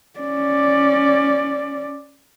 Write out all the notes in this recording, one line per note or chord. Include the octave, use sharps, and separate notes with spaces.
C#4 D5